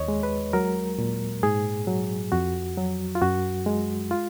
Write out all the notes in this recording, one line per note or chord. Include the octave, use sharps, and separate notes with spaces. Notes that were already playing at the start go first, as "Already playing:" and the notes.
Already playing: D#2 C#5 D#5
G#3
B4
F#3 A#4
A#2
G#2 G#4
F#3
F2 F#4
F#3
F4
F#2 F#4
G#3
F4